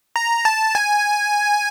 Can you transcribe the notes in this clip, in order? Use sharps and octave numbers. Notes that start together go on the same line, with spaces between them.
A#5
A5
G#5